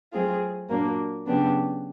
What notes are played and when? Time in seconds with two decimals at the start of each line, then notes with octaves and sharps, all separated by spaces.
0.12 F#3 A3 C4 F4 G#4
0.69 A#2 F#3 A#3 D4
1.26 C#3 F#3 B3 D4 G4